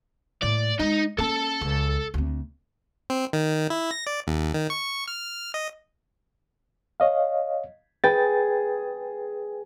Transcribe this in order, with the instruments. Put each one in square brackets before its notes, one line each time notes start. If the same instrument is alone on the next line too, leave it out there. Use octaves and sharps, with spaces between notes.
[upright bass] A2 A#3 [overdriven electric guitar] D5
[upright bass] G#3 [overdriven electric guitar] D#4
[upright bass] A#3 C#4 [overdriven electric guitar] A4 A5
[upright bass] C#2
D2 C4
[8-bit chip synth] C4
D#3
E4
A#6
D5
D#2
D#3
C#6
F6
D#5
[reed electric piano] C#5 D#5 F5
[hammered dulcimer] G#4 [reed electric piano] B4 G5 A6